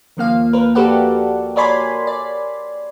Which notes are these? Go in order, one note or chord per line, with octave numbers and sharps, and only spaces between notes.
D#2 F3 A#3 F5
A#4 B4
F#4 G4 A4 B4 D5 F#5
A#4 C#5 D5 G#5 B5 C6
D5